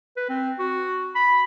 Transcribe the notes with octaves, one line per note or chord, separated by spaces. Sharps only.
B4
C4
F#4
B5